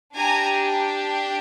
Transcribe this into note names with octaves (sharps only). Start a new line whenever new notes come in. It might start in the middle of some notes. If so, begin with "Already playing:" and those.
D4 G4 G#5 A#5